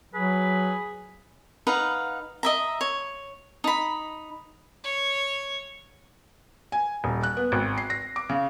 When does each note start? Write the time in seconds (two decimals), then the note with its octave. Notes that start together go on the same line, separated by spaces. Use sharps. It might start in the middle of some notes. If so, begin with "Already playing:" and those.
0.14 F#3 G#4 B4
1.67 D#4 B4 F5 F#5
2.43 D#5 E5 A#5
2.81 C#5
3.64 D#4 B5
4.83 C#5
6.72 G#5
7.04 D#1
7.23 F#6
7.37 B3
7.52 G#1
7.78 C7
7.90 A#6
8.16 D6
8.29 C#3